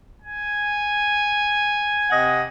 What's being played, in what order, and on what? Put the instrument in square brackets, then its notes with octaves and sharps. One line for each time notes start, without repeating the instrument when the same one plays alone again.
[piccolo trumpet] G#5
[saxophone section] C3 D#5 F#5